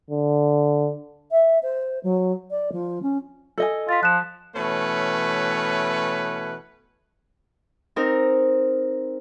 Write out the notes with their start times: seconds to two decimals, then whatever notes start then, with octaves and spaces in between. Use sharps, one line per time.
0.10 D3
1.31 E5
1.63 C5
2.04 F#3
2.51 D5
2.72 F3
3.03 C#4
3.58 A4 D#5 G#5
3.89 F4 A6 B6
4.03 F3 F#6 E7
4.54 B2 E3 A3 C#4 B4 C#5
7.96 C4 D#4 A#4